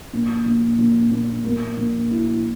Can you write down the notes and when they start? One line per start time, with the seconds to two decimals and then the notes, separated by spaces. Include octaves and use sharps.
0.13 A#2
0.46 A#2
0.79 A#2
1.11 A#2
1.45 A#3
1.77 A#2
2.11 E4